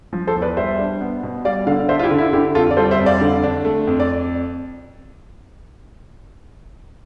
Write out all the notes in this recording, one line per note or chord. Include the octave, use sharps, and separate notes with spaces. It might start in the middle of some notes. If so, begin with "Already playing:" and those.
F3
A4 C5
E2
B4 D5
G3 C5 E5
D4
B3
B2
G3 D5 F5
D3 D5 F5
D4 C5 E5
F4
E4 G4
D3
E4
D3 E4 G4
F2 F4 A4
D5
G3 A4 C5
C5 E5
F2
D5 F5
D3
D4
A3
F2
D5